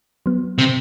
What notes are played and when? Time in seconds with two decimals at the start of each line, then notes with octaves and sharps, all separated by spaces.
0.26 F#3 B3
0.58 C3